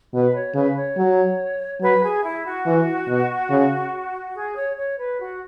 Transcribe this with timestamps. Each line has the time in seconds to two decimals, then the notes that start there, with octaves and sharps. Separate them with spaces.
0.13 B2 B4
0.34 C#5
0.54 C#3 B4
0.76 C#5
0.97 F#3
1.81 F#3 B4
2.03 G#4
2.24 E4
2.45 F#4
2.66 E3
3.08 B2
3.50 C#3
4.34 G#4
4.56 C#5
4.77 C#5
4.98 B4
5.19 F#4